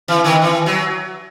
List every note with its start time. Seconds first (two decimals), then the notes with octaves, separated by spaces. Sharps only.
0.08 E3
0.24 D#3
0.42 E3
0.66 F#3